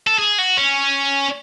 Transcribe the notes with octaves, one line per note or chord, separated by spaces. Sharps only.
A4
G#4
F#4
C#4